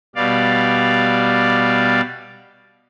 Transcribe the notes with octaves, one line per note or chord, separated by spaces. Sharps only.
B2 G3 D5 F5